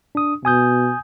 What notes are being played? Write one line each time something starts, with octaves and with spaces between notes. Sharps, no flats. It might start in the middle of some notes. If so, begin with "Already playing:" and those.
D4 D#6
B2 G#5 D#6 G6